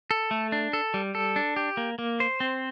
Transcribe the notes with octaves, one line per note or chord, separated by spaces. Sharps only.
A4
A3
D4
A4
G3
A4
D4
G4
A#3
A#3
C5
C4